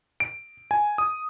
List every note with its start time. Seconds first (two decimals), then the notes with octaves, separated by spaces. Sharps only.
0.20 D7
0.71 G#5
0.98 D#6